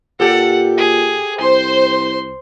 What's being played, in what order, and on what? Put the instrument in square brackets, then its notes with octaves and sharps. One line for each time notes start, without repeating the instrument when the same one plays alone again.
[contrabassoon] A#2 [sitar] G4 A4 [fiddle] F#5
[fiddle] G#4
[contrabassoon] C2 [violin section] C5 [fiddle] C6